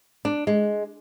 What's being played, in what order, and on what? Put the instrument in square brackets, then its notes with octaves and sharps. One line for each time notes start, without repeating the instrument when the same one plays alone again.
[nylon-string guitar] D4
G#3